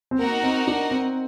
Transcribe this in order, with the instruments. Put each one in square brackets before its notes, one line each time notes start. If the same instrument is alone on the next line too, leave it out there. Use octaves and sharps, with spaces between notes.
[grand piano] C4
[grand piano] A#3 [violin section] D#4 F#4 A#4 F#5
[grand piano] C4
D4
C4